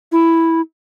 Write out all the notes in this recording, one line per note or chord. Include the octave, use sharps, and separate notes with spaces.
E4